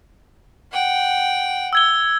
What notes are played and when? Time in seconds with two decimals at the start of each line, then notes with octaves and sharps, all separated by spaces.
0.72 F#5 G5
1.73 E6 G#6 G7